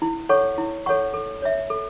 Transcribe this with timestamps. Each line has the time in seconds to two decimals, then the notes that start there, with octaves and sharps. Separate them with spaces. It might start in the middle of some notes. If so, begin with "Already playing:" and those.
0.02 E4
0.29 A4 C#5 F#5 C#6
0.58 E4
0.86 A4 C#5 F#5 C#6
1.14 A4
1.42 C#5 E5
1.70 A4